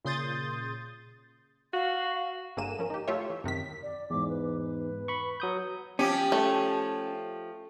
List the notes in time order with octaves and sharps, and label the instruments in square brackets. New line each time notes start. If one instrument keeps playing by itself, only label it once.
[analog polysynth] A#2 C#3 C6 D#6 G6 A6
[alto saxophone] F#4 [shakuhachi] F5
[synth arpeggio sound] G1 D3 A#3 G#4 D#7 E7
F3 C#4 A#4
D#4 G4
A3 F4 G4 C#5 E5
E3
F#2 C3 D#3 B6
[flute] D5
[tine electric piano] E2 G#2 [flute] D6
[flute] B4
[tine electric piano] B5 C#6
F#3 D#6 G6
[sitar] F3 G4 [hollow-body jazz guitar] C#4
[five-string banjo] A3